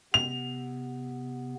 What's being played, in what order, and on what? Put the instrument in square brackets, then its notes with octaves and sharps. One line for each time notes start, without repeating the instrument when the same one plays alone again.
[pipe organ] C3 B3 [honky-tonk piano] F7